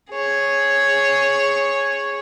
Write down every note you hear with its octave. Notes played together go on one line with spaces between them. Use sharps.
G#4 C#5